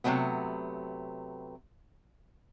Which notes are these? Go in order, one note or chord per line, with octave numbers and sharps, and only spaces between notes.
C3 E3 F#3 A3 B3